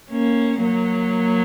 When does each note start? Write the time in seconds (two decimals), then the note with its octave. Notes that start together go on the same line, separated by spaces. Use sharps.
0.10 A#3 C#4
0.63 F#3 A#3